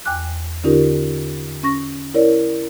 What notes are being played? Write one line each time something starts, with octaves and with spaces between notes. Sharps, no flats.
E2 G5 G#5 D6 F#6
D3 C#4 D#4 F4 G4 A#4
C#4 C#6 A#6
E4 A#4 C#5 D5